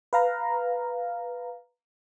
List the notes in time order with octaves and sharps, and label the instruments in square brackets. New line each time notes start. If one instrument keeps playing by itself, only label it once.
[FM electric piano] B4 F5 A#5